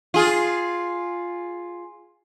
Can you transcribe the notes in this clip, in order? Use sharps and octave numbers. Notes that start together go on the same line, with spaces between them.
F4 G#4